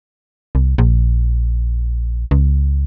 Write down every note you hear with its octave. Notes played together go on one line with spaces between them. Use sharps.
C2
A#1
C#2